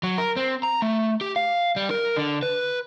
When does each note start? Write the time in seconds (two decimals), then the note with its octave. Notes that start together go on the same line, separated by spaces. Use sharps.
0.03 F#3
0.18 A#4
0.37 C4
0.63 A#5
0.82 A3
1.21 G4
1.36 F5
1.76 G3
1.90 A#4
2.16 D3
2.42 B4